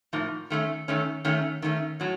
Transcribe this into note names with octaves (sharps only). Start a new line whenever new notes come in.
A2 F3 A#3 D#4
D#3 A3 C#4
D#3 A3 C#4
D#3 A3 C#4
D#3 A3 C#4
A2 F#3